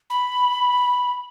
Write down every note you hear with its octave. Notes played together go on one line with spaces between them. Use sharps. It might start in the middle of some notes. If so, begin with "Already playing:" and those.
B5